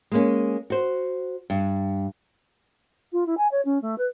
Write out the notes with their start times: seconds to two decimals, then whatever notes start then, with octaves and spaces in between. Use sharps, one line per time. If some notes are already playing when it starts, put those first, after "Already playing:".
0.12 G#3 A#3 C#4
0.70 F#4 C5
1.50 G2
3.12 F4
3.26 E4
3.38 G#5
3.52 C#5
3.65 C#4
3.82 A3
3.98 B4